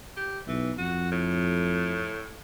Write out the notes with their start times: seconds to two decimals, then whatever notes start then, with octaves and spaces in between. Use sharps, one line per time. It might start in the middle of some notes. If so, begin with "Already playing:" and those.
0.17 G4
0.48 B1 E3
0.78 F2 F#4
1.12 A2